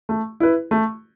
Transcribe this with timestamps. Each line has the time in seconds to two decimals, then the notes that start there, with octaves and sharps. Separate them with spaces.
0.09 A3
0.40 E4 B4
0.71 A3